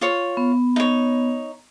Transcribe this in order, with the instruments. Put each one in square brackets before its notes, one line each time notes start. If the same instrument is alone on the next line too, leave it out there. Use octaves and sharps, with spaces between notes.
[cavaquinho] F4 C#5
[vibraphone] B3
[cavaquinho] D#4 C#5